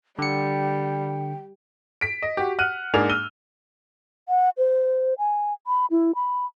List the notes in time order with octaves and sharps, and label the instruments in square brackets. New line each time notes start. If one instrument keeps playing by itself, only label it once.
[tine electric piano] D3 C#7 [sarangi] G3 [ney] G5
[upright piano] B6 D7
D#5
F#4 G4
F#5 F6 F#6 D#7
G#2 A#3 D4 G#4 G#5 F7
E6 F6 D#7 G7
[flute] F#5
C5
G#5
B5
E4
B5